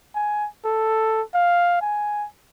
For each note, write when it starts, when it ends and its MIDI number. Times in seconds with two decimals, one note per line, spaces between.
0.15 0.47 80
0.65 1.22 69
1.34 1.81 77
1.82 2.26 80